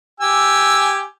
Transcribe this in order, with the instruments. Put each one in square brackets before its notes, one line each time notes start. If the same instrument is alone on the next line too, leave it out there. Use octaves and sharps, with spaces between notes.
[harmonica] G4 G#5 E6